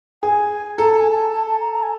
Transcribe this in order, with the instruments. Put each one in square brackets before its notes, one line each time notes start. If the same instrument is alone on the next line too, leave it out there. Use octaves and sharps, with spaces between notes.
[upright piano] G#4 [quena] G#5
[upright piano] A4 [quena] A#5
[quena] A5
G#5
A5
A5
A5
A#5
A#5
G#5